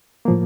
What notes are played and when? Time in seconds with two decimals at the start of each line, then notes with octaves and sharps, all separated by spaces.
0.25 A2 F3 A#3